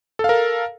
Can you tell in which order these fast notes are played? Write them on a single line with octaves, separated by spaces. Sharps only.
A4 F5 A#4